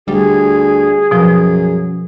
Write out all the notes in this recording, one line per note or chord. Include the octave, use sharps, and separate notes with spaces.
D2 G3 G#4
F#2 B2 F3